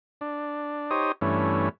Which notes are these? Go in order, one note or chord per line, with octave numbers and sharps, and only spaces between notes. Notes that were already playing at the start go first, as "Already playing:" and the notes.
D4
D#4 G4 C5 C#5 D#6
G2 E3 A3 C#4